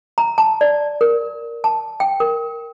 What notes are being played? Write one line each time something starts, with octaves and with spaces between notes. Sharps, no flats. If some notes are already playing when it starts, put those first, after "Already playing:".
A#5
A5
D5
A#4
A5
G5
A#4